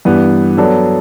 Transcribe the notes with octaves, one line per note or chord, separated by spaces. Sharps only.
G2 E3 B3
F#3 B3 D4 A4